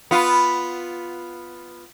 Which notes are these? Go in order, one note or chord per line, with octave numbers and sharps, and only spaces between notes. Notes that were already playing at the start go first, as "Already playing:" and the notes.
B3 F4